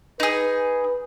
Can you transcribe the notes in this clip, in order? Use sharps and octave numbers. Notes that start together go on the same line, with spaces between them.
D#4 G#4 B4